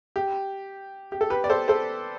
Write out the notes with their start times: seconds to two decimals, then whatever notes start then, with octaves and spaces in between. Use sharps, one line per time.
0.16 G4
1.12 G4
1.21 A4
1.30 G4 B4
1.44 D5
1.50 A4 C5
1.68 A4 C5